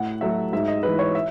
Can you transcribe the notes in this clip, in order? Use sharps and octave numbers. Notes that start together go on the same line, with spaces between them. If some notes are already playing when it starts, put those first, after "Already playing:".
Already playing: A2 F#5
F#3 A3 E5
G#2 E5
D#5
E3 G#3 B4
C#5
E5